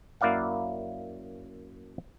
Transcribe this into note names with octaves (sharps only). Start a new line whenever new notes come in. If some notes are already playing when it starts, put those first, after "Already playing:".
F#2 A#3 E4 D5 F5 F#5